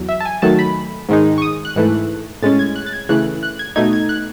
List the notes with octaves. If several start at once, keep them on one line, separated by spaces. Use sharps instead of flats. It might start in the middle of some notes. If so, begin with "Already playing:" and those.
Already playing: E2 F#3
E5
A5
G#5
D#3 F#3 A3 A5
B5
G#2 D#3 G#3 D#4
C#6
D#6
F#6
G#2 E3 A3
A2 G#3 C#4 A6
G#6
F#6
A6
G#6
C#3 E3 A3 F#6
F#6
G#6
B2 A3 D#4 G#6
G#6
F#6